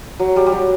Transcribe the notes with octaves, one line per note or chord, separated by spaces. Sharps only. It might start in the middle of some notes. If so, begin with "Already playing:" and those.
F#3
G3
G3
F#3